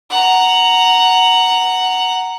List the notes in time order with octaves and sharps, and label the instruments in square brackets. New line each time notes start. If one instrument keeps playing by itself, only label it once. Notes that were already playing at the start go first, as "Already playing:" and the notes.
[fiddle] F#5 A#5